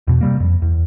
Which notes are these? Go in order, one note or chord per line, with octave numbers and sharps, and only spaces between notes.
E2 B2
C3 G3 A#3
F2
E2